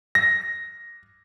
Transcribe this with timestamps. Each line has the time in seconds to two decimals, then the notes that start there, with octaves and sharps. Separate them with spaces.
0.15 A#6